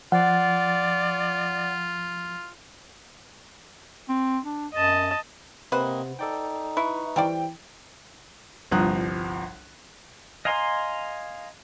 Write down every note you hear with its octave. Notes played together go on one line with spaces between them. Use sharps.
F3 F4 D5 F#5
C4
D4
F#2 D#5 A5
C3 A#3 C4 B4 C5 D#5 F#5
D#4 A4 D5 G5
E4 B4 C#6
E3 G3 C5 D5 G5
G1 C2 F3 A#5 D#6 F#6
D#5 F5 G#5 A#5 C6